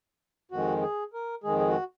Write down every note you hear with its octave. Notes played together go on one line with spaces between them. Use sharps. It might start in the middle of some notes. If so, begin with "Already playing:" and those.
F2 D#3 G#3 F#4
G#4
A#4
F2 D#3 G#3 G#4
G#4
F#4